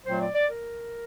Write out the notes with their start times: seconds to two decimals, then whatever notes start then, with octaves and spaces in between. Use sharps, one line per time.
0.05 A#2 F#3 A3 C4 C5
0.20 D5
0.34 D5
0.48 A#4